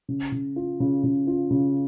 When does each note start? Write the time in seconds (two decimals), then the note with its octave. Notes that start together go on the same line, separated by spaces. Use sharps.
0.08 C#3
0.32 C#3
0.56 F4
0.80 C#3
1.04 C#3
1.27 F4
1.50 C#3